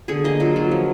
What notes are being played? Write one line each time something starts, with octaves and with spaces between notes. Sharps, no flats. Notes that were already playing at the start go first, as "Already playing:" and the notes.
D3 G#4
A#3 D#5
F#3 F4
F#3
F3